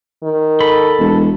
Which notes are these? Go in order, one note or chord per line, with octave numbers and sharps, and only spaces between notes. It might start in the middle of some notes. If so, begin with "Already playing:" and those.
D#3
A4 B5
E1